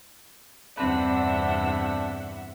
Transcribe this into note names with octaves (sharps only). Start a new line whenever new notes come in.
E2 G2 C3 C4 D4 B4 E5 F#5